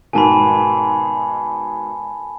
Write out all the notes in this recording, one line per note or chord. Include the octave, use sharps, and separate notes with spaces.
G#2 B2 D#3 G#5 A5 B5